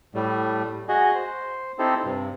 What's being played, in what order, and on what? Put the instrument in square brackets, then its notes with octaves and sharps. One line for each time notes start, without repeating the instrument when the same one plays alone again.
[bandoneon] A2 G3 A3
F#4 G#4 D#5
C5
C4 D#4 E4 G4 A4 C5
G2 C3